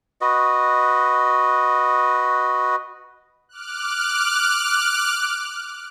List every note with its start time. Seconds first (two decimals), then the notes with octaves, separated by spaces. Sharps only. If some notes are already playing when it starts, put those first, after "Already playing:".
0.21 F#4 B4 D#5
3.49 D6 F6 F#6